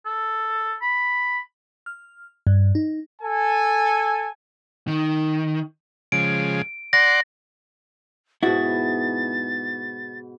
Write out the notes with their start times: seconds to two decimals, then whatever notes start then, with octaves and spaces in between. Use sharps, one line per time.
0.06 A4
0.82 B5
1.86 F6
2.47 G2
2.75 D#4
3.22 A4 G#5
4.88 D#3
6.12 C#3 F3 G#3 D7
6.93 D5 F#5 C6 A#6
8.43 G#2 B2 E4 F#4 A6